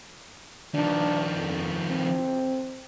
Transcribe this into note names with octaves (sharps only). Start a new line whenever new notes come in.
D#3 F3 D4
F2
C4